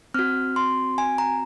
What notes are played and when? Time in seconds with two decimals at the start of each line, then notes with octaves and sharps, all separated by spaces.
0.14 C4 F#4 F6
0.56 C6
0.98 G#5
1.18 A#5